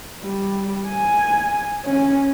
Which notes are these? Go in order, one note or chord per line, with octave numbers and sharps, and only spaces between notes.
G3
G#5
C#4